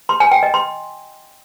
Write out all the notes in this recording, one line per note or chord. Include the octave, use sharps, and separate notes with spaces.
C6
G#5
G5
D#5
C6